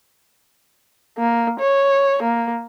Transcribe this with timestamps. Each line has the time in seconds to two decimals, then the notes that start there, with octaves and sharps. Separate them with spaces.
1.18 A#3
1.60 C#5
2.22 A#3